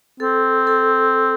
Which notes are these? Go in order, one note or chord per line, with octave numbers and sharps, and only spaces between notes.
C4 A4
A4